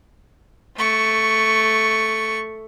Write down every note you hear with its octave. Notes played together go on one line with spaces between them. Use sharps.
A3 C#6